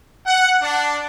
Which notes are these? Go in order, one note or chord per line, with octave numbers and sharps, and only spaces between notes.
F#5
D4